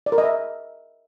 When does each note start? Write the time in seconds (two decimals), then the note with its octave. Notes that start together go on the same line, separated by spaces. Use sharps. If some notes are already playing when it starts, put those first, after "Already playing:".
0.06 D5
0.12 A#4
0.18 D#5
0.24 E5